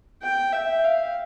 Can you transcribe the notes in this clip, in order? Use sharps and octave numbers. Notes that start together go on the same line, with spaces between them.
G5
E5
F5